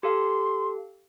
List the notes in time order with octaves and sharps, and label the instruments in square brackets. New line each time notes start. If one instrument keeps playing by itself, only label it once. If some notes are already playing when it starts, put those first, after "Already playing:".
[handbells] G4 A4 F5 [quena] C6